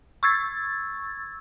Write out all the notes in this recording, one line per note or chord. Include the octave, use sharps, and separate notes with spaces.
C#6 E6 G#6 A6